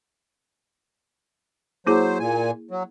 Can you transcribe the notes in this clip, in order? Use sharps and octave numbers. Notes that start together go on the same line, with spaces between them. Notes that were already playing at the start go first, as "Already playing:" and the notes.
F#3 A#3 E4 G#4 C5
A#2 G#5
F#3